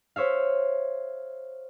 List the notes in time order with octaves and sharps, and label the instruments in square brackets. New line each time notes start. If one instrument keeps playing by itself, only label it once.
[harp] C5 C#5 E5 F5